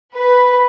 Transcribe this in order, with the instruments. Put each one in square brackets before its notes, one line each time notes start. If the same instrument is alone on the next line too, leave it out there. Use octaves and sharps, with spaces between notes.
[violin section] B4